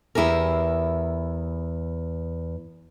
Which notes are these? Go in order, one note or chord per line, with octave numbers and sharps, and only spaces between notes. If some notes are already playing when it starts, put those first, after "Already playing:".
E2 E4 G4 G#4 A#4